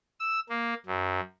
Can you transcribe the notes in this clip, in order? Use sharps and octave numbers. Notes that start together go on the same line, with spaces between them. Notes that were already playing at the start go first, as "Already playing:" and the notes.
E6
A#3
F#2